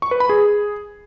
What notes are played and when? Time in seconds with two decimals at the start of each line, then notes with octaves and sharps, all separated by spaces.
0.02 C#6
0.11 B4
0.20 B5
0.29 G#4